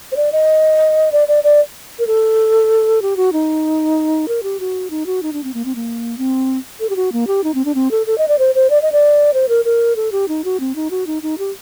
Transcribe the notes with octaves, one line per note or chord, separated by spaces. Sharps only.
C5
D5
D#5
D5
D5
D5
A#4
A4
G4
F#4
D#4
A#4
G4
F#4
D#4
F#4
D#4
D4
C4
A#3
C4
A#3
C4
A4
G4
F#4
A#3
G4
D#4
C4
D4
C4
A4
A4
D#5
D5
C5
C5
D5
D#5
D5
C5
A#4
A#4
A4
G4
D#4
F#4
C4
D#4
F#4
D#4
D#4
G4